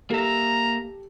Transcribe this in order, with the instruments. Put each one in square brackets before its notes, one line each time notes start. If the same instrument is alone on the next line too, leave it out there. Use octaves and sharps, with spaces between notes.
[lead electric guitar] A#3 E5 [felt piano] G4 A4 [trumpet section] A#5